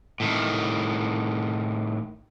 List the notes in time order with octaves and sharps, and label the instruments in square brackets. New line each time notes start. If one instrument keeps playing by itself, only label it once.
[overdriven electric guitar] A2 D#3